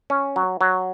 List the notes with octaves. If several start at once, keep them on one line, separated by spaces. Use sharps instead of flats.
C#4
F#3
F#3